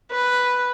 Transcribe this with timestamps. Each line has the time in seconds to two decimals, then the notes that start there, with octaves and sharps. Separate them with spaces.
0.12 B4